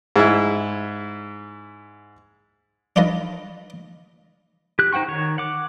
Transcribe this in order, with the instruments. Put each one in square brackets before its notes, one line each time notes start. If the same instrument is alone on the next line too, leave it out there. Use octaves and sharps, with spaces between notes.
[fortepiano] G#2 E4
[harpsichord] D4 D#4 F4 B4 D#5
[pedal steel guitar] G4 F#6
D#4 C5 F#5 G5 C#6
D#3 C#5
F#5 D6